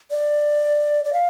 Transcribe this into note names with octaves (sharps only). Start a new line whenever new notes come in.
D5
D5
F5